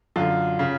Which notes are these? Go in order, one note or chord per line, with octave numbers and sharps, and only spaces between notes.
F#2 D3 F4
C#3